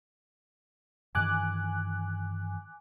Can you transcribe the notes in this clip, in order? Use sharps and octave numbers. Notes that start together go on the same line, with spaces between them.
G2 D#3 E3 G#5 D6 F#6